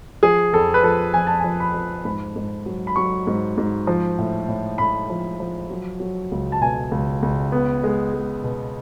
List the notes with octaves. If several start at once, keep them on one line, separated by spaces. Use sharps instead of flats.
F3 G#4
F2 A4
B4
F3 A4
F2 G#5
A5
F3 G#5
B5
F3
G#2 B5
G#2
F#3
B5
F#3 C#6
G#2
G#2
F3
A2
A2
A2 B5
F3
F3
F#3
F#3
C#2
A5
B2 G#5
C#2
C#2
B3
G#3
G#3
B2